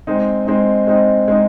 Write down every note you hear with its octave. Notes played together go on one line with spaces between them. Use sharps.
G#3 C4 D#4
G#3 C4 D#4
G#3 C4 D#4
G#3 C4 D#4